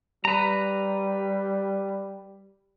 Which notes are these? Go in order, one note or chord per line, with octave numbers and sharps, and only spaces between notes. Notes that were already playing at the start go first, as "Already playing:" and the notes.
G3 B4 A#5